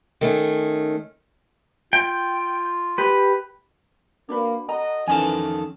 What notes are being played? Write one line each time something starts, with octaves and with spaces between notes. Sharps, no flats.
D#3 A3 C#4
F4 G5
G4 B4
A#3 D4 F#4 B4
F#4 A4 D#5 A#5
F2 D#3 E3 C#4 A4 G#5